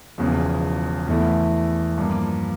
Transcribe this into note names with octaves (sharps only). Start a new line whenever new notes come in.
E1 E2 C#3 F3
E2 E3 A3 E4
G2 F3 A#3